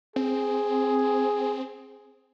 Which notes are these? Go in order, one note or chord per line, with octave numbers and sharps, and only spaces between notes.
C4 G#4